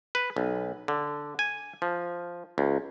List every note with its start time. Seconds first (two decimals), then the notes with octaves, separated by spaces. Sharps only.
0.15 B4
0.36 B1
0.88 D3
1.39 G#5
1.82 F3
2.58 C#2